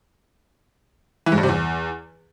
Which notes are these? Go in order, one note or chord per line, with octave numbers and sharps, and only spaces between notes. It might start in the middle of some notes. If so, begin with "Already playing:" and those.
E3
G#2
G2
C3
E2